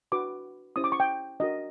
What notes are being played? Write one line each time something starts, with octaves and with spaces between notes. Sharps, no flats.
D4 F#4 B4 D6
C#4 E4 G4 C5 D#6
D6
C#6
G5
D4 F#4 A#4 D#5